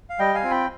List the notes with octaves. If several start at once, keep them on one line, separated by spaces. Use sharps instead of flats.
F5
G3 D#5 G5
F5 G#5
C4 F4
G5 B5